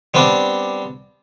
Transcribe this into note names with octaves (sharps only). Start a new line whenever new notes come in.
G3 B3 C4 D4